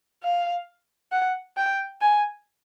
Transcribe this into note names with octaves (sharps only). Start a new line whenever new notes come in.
F5
F#5
G5
G#5